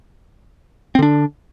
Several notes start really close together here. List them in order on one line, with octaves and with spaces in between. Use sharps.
C4 D3 D4